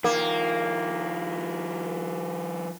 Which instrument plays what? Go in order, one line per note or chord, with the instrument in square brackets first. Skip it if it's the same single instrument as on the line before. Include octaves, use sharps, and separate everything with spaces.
[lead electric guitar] D#3 F3 [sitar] A#3